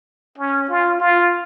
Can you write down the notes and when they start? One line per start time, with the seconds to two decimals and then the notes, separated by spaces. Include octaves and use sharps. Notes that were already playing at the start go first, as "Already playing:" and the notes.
0.38 C#4
0.69 F4
1.01 F4